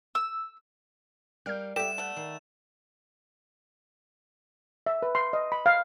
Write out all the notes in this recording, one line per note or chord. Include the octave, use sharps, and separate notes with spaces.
E6
G3 A#4 F5 F6 G6
G3 B3 G4 A4 E5 E7
A3 F#5
D#3
E5
B4
C6
D#5
B5
F5